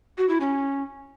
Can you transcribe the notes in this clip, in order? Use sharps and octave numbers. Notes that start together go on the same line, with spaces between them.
F#4
E4
C#4